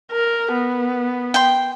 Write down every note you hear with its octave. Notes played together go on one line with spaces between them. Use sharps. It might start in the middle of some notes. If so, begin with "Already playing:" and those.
A#4
B3
G5 C6